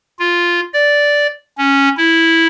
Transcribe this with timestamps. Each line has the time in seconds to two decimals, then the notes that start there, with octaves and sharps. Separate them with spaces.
0.19 F4
0.74 D5
1.58 C#4
1.97 E4